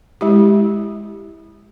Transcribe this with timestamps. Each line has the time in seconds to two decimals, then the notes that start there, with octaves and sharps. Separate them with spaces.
0.21 G#3 E4 G4